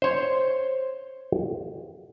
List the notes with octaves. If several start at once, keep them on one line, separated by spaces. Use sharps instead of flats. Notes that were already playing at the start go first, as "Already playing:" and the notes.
C5 C#5